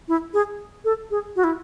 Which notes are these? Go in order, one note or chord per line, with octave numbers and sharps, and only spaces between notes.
E4
G#4
A4
G#4
F#4
E4